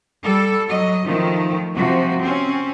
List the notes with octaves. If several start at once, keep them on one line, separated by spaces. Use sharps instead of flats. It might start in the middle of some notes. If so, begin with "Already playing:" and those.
G3 A4
F#3 D#5
D#3 F3 A3
C3 F3 F#4
C4 C#4